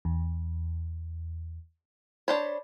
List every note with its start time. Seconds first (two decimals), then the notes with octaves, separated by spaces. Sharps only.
0.05 E2
2.28 D4 C5 C#5 B5